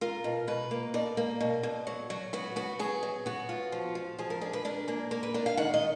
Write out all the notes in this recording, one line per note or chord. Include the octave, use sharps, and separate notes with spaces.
F4 A#4
B2
B2 B4
A#3
B2 D5
A#3
B2
B2
F#3
F#3
B3 F#4
B3 F#4
F#3 G#4
F#3
B3 F#4
F4
F3
F3
F3 G#4
A#4
D4 G#4
B4
D4 A#4
A#3 G#4
A#3 A#4
B4
D4 D5
F5
D#3 F#5
D#5